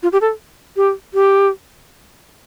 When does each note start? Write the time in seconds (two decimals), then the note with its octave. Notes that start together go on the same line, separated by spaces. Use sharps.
0.03 F4
0.12 G4
0.21 A4
0.77 G4
1.14 G4